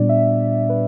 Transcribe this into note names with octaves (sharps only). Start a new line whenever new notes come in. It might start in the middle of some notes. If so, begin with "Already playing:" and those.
Already playing: A#2 G3 B3 D4 D5
E5
B4